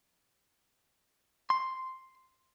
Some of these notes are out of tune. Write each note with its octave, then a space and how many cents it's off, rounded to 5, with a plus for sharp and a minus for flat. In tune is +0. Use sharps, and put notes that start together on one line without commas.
C6 +0